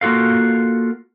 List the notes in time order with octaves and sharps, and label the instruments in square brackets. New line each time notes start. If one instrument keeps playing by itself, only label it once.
[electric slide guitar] A#3 F4 F#4 A4 F5